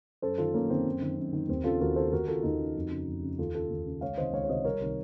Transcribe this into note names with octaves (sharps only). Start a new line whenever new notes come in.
F#2 A4 C5
D#3 F4 A4
F#2 A#3 C#4
D#3 C4
F#2
D#3
F#2
D#3
D#2 C4
C#3 F4 A4
D#2 F#4 A#4
C#3 A4 C5
D#2 F#4 A#4
C#3 F4 A4
D#2 D#4 F#4
C#3
F2
C#3
F2
C#3
D#2 F4 A4
C#3 F4 A4
D#2
C#3
C#2 C#5 F5
C3 D#3 C5 D#5
C#2 C#5 F5
C#5
C3 D#3 C5 D#5
C2 A#4 C#5
C3 D#3